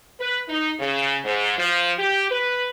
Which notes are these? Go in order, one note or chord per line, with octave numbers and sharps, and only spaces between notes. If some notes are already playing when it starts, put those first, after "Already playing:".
B4
D#4
C#3
G#2
F3
G4
B4